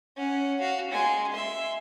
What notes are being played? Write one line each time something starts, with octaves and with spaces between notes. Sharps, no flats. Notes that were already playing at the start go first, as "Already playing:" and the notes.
C#4 F#5
F#4 F5
G#3 G#5
E5 C6